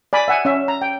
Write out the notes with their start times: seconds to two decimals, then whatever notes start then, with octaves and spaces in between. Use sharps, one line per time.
0.13 D5 G#5 B5
0.28 E5 F#5 G#5
0.45 C#4 E5
0.68 A#5
0.82 G5